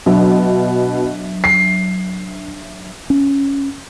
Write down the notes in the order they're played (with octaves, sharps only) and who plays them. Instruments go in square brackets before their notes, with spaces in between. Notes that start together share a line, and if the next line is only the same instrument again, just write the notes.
[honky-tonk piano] B2 [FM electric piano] F#3 D4 E5
[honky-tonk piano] C7
[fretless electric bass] C#4